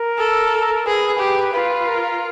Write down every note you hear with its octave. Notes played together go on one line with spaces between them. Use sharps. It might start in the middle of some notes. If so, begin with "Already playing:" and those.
Already playing: A#4
A4
G#4 B4
G4
F4 B4
A#4